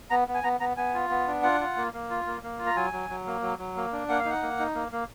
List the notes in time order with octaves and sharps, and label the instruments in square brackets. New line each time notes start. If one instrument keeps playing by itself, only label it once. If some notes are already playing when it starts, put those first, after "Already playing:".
[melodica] B3 A#5
B3
G#5
B3 A#5
B3 A#5
B3 G#5
F4
B3
D4
F4 F#5
F4
A#3
A#3
F4
A#3
A#3
F4
A#5
F#3 G#5
F#3
F#3
A#3
F#3
F#3
A#3
D4
A#3 F#5
F5
D#4
F#5
A#3
D#4
A#3
A#3